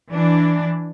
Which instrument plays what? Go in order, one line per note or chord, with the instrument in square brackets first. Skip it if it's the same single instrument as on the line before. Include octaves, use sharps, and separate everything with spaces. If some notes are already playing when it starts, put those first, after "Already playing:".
[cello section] E3 D4